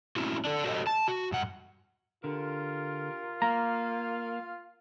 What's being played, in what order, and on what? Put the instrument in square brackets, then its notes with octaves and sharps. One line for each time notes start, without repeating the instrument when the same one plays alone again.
[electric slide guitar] C4 C#4 E4 F#4
D4 A4
F#4 G4 A4 C5 C#5 D#5
A5
F#4
G2 F#5
[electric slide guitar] D3 [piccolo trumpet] F4 [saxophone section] G4 A#4
[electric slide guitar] A#3 [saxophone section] F5 [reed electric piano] A#5